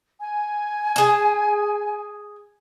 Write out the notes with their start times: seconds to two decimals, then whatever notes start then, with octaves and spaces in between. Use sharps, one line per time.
0.19 G#5
0.96 G#4 A5